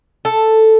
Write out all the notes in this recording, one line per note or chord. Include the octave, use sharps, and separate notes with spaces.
A4